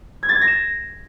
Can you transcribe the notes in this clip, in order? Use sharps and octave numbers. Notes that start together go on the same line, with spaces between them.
G#6
A6
G#6
A#6
E7